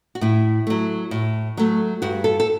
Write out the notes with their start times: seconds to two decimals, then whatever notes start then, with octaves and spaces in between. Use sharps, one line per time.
0.15 F#4
0.21 A2 E4
0.67 F#3 A3
1.11 A2
1.57 F#3 A3
2.02 G2 F#4
2.24 A4
2.40 A4